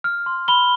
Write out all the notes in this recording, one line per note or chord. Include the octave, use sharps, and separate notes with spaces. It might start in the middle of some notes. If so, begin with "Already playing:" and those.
F6
C6
B5 G7